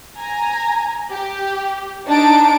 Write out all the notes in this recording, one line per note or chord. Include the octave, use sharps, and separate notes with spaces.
G#5 A#5
G4
D4 D#4 A5 D7